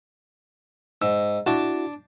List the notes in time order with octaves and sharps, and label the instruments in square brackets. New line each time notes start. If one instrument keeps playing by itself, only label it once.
[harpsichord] G#2 [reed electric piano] E6
[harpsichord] D4 A5 [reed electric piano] E4 F#4